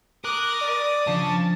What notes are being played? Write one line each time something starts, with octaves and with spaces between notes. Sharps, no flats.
A#4 D6 D#6 F#6
D5
C#3 F3 D4 A5